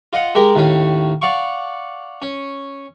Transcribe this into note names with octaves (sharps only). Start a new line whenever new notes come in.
F4 D#5 F#5
G#3 G4 A#4
D#2 A2 C#4
D5 F5 F#5 C#6
C#4